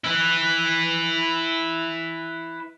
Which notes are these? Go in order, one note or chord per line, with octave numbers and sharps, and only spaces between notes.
E4 B4